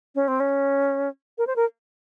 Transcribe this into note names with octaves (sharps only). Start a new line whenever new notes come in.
C#4
C4
C#4
A#4
C5
A#4